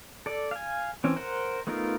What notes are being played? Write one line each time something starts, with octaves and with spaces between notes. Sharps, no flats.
A4 D5
F5 G#5
E3 C4 C#4
A#4 C5 F#5
A3 B3 D#4 F4 A#4